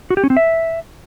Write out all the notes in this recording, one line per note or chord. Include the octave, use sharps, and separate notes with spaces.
F#4
G4
C#4
C4
E5